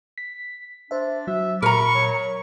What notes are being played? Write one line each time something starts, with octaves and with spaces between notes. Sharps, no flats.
B6
D4 C5 E5
F#3 F#4 E5
A#2 A#4 A#5 B5 C#6
F#3